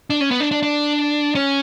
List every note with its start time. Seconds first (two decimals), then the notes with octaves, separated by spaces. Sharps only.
0.10 D4
0.21 C#4
0.31 B3
0.40 D4
0.51 D4
0.63 D4
1.35 C#4